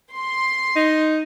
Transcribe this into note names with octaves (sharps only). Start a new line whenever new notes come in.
C6
D#4